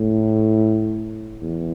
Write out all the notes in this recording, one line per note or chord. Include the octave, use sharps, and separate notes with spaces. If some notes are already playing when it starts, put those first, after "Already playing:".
Already playing: A2
E2